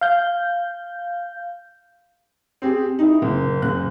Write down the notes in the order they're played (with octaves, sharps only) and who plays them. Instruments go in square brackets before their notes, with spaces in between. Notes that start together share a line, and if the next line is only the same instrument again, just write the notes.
[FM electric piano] F5 G6
[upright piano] C4 G4 G#4
D#4 E4
F#1
F#1 F#6